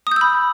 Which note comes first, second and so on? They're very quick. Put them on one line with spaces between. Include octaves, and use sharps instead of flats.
D#6 G6 E6 B5